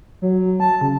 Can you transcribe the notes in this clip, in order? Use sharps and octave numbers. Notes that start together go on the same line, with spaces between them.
F#3
A5
C#3